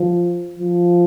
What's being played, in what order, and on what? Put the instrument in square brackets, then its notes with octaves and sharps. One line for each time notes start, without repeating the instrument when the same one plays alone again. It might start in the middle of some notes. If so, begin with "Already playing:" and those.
Already playing: [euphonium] F3
F3